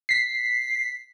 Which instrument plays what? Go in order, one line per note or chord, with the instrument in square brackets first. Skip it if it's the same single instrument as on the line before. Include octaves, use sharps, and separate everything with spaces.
[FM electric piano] B6 C7